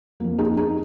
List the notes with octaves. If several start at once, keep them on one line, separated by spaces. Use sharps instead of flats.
F2 F3 A#3
D#4 G#4
D#4 G#4